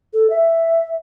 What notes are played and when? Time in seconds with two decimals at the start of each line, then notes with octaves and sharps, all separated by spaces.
0.14 A4
0.30 E5